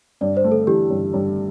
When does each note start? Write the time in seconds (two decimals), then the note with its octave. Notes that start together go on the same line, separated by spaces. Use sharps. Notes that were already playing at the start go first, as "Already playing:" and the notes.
0.21 G2 D5
0.37 C5
0.44 A3
0.52 A4
0.67 E3 G4
0.90 G2
1.13 G2